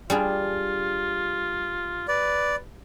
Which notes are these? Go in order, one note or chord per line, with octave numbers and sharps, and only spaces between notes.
G3 D4 F4 G#4
B4 D5